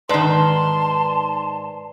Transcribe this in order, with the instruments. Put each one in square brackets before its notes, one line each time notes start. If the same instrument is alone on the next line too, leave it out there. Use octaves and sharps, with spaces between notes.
[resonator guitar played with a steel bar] G#2 D#3 [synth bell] B4 D5 C7 [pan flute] A5 [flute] C6